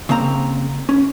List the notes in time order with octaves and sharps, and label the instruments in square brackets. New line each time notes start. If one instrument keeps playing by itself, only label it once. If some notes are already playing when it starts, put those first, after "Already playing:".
[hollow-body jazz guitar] C#3 A#3 C4 A#5
C#4